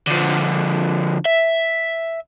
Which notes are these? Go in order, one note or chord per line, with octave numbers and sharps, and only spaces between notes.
D3 F3
E5